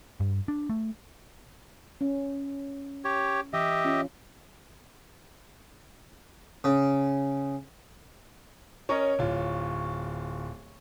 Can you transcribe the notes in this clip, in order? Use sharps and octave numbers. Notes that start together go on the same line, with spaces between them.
G2
D4
A3
C#4
G4 C#5
E3 G4 D#5 E5
C#4 F4
C#3
C#4 A#4 C#5 D#5
D1 F4